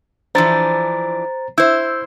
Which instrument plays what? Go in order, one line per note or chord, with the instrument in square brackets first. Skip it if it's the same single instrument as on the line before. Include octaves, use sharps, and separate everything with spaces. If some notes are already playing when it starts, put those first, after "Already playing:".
[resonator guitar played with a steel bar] E3 F3 D4 [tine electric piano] C5 A#5 A6
[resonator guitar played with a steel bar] E4 C5 [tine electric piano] E6 G6